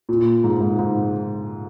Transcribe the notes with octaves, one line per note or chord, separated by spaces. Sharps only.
A#2
G#2
G#2
G#2